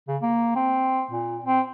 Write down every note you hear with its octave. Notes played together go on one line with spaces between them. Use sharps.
C#3
A#3
C4
A#2
C4